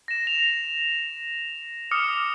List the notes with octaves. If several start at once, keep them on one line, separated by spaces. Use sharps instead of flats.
A#6 E7
F7
D6 D#6 F6 C#7